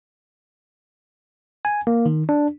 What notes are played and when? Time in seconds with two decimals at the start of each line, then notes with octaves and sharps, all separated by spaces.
1.65 G#5
1.87 A#3
2.06 D#3
2.29 D4